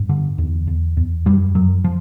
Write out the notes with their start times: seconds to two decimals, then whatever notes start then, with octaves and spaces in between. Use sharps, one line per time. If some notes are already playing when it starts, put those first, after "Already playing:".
Already playing: G2
0.09 D3
0.38 E2
0.67 E2
0.97 E2
1.26 F#2 G3
1.55 F#2 F#3
1.84 F3